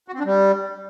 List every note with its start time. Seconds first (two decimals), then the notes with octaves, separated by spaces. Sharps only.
0.08 F#4
0.14 C4
0.20 D4
0.25 G3